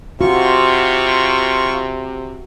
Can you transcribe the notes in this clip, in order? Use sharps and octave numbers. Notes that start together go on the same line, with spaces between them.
C3 F4 F#4 C#6